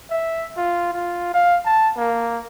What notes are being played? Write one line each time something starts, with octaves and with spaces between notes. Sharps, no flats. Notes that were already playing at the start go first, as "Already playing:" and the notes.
E5
F4
F4
F5
A5
A#3